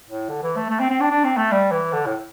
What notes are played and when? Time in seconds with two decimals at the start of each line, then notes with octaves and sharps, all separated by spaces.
0.09 A2
0.29 D3
0.43 E3
0.56 A3
0.69 A3
0.80 C4
0.90 C4
1.01 D4
1.11 D4
1.24 C4
1.37 A3
1.52 G3
1.71 E3
1.92 D3
2.06 A2